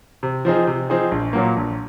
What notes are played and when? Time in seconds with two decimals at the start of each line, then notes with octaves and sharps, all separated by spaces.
0.23 C3
0.45 F3 C4 D#4 G#4
0.67 C3
0.90 F3 C4 D#4 G#4
1.11 A#1
1.33 A#2 F#3 A#3
1.56 A#1